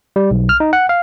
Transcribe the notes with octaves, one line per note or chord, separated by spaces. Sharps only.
G3
B1
F6
D#4
F#5
F5